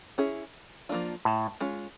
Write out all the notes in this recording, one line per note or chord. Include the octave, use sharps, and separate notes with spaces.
C#4 E4 G#4
F3 A#3 D4 F4
A2
G#3 C#4 F4